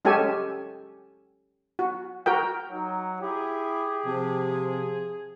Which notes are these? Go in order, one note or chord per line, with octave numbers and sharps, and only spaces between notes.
G#3 C#4 G4 A4 G#5
F#4
F#4 A#4 G5
F#3 D#4
E4 G4 G#4
C3 F3